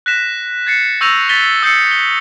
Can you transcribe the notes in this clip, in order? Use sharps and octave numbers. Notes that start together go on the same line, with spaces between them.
F#6 A#6 B6 E7
G#6 A6 C7 C#7
C#6 E6 G6 A#6 D#7 F7
A6 B6 D#7 G7
D#6 E6 G6 A6 C7 C#7
G7